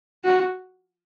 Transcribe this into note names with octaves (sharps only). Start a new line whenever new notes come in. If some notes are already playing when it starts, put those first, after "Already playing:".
F#4